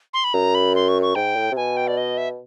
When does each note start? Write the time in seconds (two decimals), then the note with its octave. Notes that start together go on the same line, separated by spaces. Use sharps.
0.14 C6
0.24 B5
0.33 F#2 A#5
0.55 B5
0.75 C6
0.88 C#6
1.02 C#6
1.15 G#2 G5
1.36 A2
1.52 C3
1.57 B2 G#5
1.77 G5
1.88 D5
1.97 D#5
2.17 E5